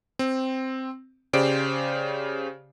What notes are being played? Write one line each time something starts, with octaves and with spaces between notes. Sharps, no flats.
C4
C#3 G4 C5 D5 D7